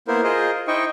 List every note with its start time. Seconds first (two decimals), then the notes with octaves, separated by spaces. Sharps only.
0.08 A#3 B3 E4 A#4 C5
0.24 F4 G#4 A#4 C5 D#5
0.68 D#4 E4 C5 D#5 G5 C#6